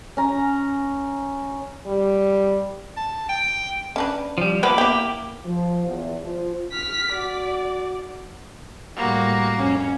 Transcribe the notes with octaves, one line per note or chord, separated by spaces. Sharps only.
C#4 A#5
G3
A5
G5
C#4 D4 B4
F3 G3
C3 F3 A#3 B3 B5 D6
B3 E4 G4
F3
E2
F3
F6 B6
F#4 D5
A2 G3 A#3 F#4
F2 C#4